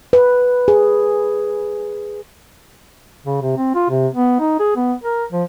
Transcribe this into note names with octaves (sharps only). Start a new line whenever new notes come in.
B4
G#4
C#3
C3
C4
F4
C3
B3
D#4
G#4
B3
A#4
F3